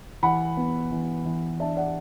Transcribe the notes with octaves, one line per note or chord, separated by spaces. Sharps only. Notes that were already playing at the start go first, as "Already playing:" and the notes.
E3 F#5 B5
B3
E3
E3
D4 E5 A5
D5 F#5